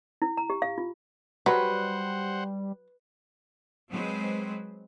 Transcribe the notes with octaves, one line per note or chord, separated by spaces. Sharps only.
E4
A#5
G4
F5
F4
F#3 G3 B4 C5 F#5
F#3 G#3 C4 B4 C5